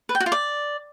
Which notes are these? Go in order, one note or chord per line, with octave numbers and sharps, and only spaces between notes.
B4
G5
F#4
F4
D5